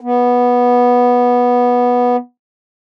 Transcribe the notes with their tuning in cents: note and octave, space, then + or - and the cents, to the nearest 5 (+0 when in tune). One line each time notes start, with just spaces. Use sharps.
B3 -10